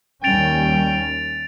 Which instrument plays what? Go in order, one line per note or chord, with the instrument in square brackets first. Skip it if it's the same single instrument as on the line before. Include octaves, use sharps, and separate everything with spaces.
[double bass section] D#2 G3 C#4 [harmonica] G5 [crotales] A6 D7 F7